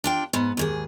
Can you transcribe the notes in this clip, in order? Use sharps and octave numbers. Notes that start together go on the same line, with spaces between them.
D4 F4 G5
G#2 B3
D#2 G#2 G#4